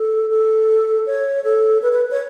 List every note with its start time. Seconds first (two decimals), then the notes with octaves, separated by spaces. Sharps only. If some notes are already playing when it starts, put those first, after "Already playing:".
Already playing: A4
0.30 A4
1.06 C#5
1.44 A4
1.82 B4
1.92 B4
2.11 C#5